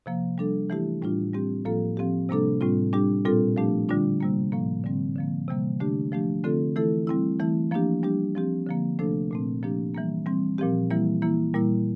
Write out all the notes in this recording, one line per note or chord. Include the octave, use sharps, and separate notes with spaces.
C3 F3 A#3
G3 D4 A4
E3 A3 E4 G4
A2 G3 D4 F4
G3 C4 G4
A2 F3 A#3 F4 A4
F3 C4 G4
C3 G3 A#3 D4 A4
A2 G3 C4 F4
G3 D4 G4
A#2 G3 C4 F4 A4
F3 A3 D4 G4
D3 G3 D4 F4
C3 G3 A#3
A2 F3 A#3
D3 G3 C4
D3 F3 A#3
C3 E3 G3 A#3
D3 A3 D4 G4
F3 A3 D4 G4
D3 A3 C4 F4 A4
E3 A3 E4 A4
G3 C4 E4
E3 A3 E4
F3 A#3 D4 G4
G3 D4 G4
F3 C4 G4
D3 F3 A#3
C3 F3 A3 D4 A4
A#2 A3 C4
F3 A#3 D4 G4
E3 G3 A#3
E3 G3 C4
A#2 F3 C4 G4
E3 G3 A#3 E4
E3 A#3 E4
A#2 G3 A#3 E4